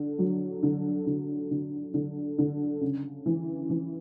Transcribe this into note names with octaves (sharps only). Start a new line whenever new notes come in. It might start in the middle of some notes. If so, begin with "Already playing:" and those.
Already playing: D3
F#3
D3
D3
D3
D3
D3
C#3
E3
E3